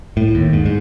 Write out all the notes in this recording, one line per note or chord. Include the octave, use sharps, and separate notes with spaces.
A2
D#2
G#2
G#2